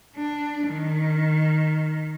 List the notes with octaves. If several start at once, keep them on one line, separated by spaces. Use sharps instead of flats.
D4
D#3